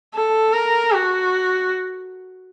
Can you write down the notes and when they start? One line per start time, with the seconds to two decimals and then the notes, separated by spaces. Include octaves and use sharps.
0.15 A4
0.53 A#4
0.92 F#4